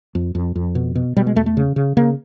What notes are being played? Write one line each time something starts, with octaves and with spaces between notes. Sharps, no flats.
F2
F2
F2
B2
B2
B2 G3
G#3
E2 A3
A3
C#3
C#3
C#3 A#3